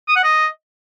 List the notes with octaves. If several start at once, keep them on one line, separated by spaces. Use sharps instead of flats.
D#6
F#5
D#5